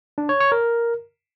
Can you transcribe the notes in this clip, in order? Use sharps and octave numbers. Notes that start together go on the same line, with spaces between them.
D4
C#5
C#5
A#4